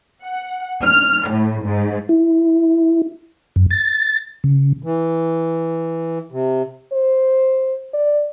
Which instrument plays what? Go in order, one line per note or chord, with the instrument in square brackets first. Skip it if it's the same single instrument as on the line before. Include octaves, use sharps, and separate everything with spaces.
[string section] F#5
F6
A2
G#2
[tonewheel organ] E4
F#2
A6
C#3
[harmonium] E3
C3
[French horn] C5
D5